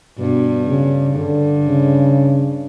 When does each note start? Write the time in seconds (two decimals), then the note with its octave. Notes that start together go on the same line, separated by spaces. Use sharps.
0.19 G2 B2
0.67 C#3
1.16 G2 D3
1.65 C#3